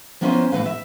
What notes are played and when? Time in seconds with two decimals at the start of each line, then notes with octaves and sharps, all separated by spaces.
0.21 F3 A#3 B3 C#4 E4 C5
0.52 A2 E3 A3 B4 F5
0.66 E5